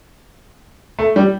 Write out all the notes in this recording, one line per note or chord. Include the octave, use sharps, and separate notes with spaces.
A3
G3